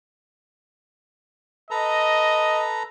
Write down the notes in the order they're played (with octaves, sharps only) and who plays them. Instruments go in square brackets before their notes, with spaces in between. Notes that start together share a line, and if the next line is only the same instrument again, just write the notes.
[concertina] A4 B4 A#5 [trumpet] D#5